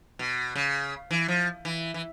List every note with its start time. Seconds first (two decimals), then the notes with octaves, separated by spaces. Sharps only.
0.19 B2
0.56 C#3
1.11 E3
1.28 F3
1.65 E3
1.94 E3